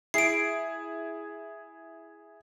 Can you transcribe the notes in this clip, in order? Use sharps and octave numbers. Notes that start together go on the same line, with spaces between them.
E4 G#4 C7 D7